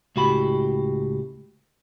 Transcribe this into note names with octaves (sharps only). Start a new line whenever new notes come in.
C#2 A2 F#4 G4 B5